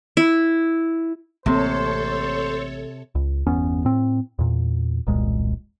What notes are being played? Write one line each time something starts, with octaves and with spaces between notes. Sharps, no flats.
E4
A1 C3 A#3 A4 C5 C#5
C#2
G1 E2 B3 C#4
A2 C4
E2 A#2
E1 C2 A#2 G#3